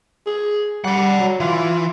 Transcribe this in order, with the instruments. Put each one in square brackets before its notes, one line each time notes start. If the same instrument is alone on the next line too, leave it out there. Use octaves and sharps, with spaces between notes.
[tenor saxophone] G#4
[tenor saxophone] G3 [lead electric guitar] D5 F#5
[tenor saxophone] F#3
[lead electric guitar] E3 [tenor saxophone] F4